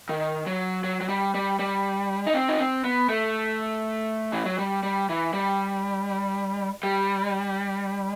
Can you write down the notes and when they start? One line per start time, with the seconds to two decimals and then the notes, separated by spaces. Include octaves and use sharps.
0.09 D#3
0.46 F#3
0.84 F#3
1.01 F#3
1.09 G3
1.34 G3
1.59 G3
2.27 D#4
2.34 C4
2.48 D#4
2.60 C4
2.84 B3
3.09 A3
4.33 E3
4.45 F#3
4.58 G3
4.83 G3
5.09 E3
5.33 G3
6.83 G3